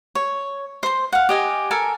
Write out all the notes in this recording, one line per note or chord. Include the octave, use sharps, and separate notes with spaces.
C#5
C5 C6
F5 F#5
G4 D#5 G#5
A4 A#4 G#5